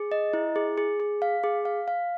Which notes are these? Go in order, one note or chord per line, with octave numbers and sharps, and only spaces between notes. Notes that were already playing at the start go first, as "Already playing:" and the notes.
Already playing: G#4
D#5
E4
G#4
G#4
G#4
F5
G#4
F5
F5